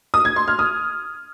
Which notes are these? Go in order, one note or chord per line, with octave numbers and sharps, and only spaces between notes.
D#6
G#6
C6
F6
D#6